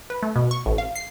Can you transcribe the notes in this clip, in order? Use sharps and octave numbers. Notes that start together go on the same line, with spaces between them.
B4
A3
B2
C#6
A1
F5
C7